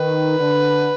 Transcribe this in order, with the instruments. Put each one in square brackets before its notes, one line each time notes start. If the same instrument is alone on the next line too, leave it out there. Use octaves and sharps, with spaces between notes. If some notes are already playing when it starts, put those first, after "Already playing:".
Already playing: [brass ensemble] D#3 [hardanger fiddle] B4
[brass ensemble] D3